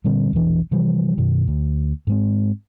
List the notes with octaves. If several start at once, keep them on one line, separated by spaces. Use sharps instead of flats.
A#2 D3 G3 C4
E1 A#1 E3 D4
C3 E3 F3 G3
F#2 B2 D#3
D2
G#2 G#3 C4